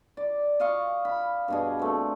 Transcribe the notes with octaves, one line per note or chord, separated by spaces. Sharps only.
D5
D#5 F5 C#6
B5
G2 B2 G#4
A3 C4